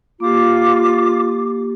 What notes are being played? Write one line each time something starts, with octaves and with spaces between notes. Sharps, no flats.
A#3 F4 G4 D6